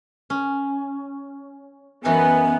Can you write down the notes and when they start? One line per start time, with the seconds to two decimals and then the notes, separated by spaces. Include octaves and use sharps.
0.30 C#4
2.05 F#2 E3 B3 D#4 G#5